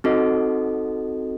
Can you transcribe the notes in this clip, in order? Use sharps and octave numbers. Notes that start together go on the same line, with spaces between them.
C4 D#4 F#4 A4 D#5